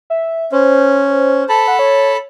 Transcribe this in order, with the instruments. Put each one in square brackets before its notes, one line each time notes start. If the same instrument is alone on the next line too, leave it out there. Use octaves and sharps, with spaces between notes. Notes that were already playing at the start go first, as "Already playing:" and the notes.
[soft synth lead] E5
[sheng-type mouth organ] C#4 [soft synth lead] C5
[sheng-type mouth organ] A4 A5 B5
[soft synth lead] F#5
C#5